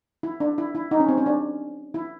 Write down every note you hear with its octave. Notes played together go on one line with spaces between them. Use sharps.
E4
D4
E4
E4
D#4
C#4
C4
C#4
D4
E4